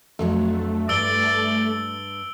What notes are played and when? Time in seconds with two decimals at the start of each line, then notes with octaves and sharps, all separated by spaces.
0.19 F2 F#3 A3 D4
0.89 G2 D5 E6 D7 G7